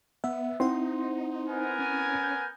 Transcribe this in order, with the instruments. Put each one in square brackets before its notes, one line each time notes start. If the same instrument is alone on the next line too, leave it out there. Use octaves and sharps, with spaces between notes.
[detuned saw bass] B3 [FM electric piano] E5 [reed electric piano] F#5
[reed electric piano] C4 E4 [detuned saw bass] D#4 [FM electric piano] C5 F#5 C6
[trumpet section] B3 A#4 G#5
[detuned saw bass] C#4
[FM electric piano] G6